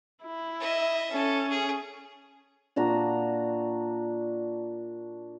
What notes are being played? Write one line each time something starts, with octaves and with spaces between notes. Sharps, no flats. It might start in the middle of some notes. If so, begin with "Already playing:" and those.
E4
D#5 E5
C#4 A4
G#4
A#2 D4 F#4 A#5